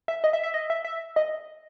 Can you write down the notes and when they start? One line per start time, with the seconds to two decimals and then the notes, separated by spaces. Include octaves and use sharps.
0.08 E5
0.24 D#5
0.33 E5
0.43 E5
0.54 D#5
0.70 E5
0.85 E5
1.16 D#5